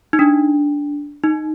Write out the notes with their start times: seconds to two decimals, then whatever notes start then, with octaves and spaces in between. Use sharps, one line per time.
0.13 D#4
0.19 D4
1.24 D#4